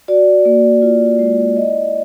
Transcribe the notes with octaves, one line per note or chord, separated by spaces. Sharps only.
F#4 D5
A#3
F4
G#3
E4 D#5